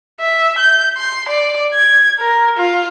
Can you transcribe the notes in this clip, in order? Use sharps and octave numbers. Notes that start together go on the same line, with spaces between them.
E5
G6
C6
D5
G#6
A#4
F4